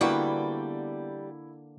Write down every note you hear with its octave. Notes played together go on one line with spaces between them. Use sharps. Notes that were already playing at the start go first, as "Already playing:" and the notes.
D3 G3 A#3 B3 E4 F#4 D5 G5